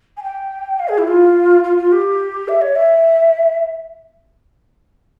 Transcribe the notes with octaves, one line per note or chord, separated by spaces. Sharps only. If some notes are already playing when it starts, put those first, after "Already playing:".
G#5
G5
F5
G#4
E4
F4
F4
F4
G4
E5
C#5
E5